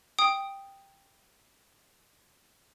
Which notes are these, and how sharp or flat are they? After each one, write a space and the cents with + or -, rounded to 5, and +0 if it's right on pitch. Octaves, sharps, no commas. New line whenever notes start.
G5 +5 D#6 +0